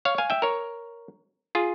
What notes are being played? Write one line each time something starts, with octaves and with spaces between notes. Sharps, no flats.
C#5 F5
F5 G#5
E5 G5
A#4 C#5
F4 G#4